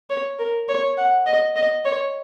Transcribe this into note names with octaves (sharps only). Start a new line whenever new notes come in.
C#5
A#4
C#5
F#5
D#5
D#5
C#5